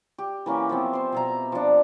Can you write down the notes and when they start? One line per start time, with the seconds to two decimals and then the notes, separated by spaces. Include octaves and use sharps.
0.18 G4
0.46 E3 A#3 C#4
0.69 F3 B3 C4
0.93 C5 C6
1.12 B2 E5 A#5
1.52 F3 D4